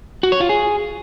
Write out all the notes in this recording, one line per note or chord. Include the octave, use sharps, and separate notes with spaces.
F#4
C#5
F4
G#4